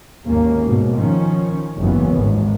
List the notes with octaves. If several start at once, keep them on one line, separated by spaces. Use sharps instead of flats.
G#1 D#2 A#3 C#4
G#2 B2
D#3 F3 C#4
F#1 D#2 G#2 E3 B3 C#4
G#1